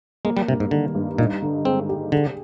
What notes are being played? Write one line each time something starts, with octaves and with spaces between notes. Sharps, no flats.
G#3 A#3
G3
G2 C3
G#2
D3 D#3
G2
A#2 D#4
D3
G#3 C4
G4
D3 G#4